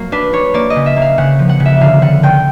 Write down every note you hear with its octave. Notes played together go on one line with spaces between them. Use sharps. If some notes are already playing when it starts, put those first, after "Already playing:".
Already playing: F#3 A#3
D4 B4
D4 C#5
A#3 D5
D#5
C#3
E5
A#3
F5
C#3 F#5
F3
F#5
C#3
E5
D3 F5
D3 F#5
D3 G5